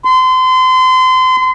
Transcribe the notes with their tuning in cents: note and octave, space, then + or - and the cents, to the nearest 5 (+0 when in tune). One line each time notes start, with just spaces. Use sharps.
C6 -30